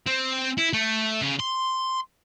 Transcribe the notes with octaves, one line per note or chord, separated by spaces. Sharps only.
C4
E4
A3
C#3
C6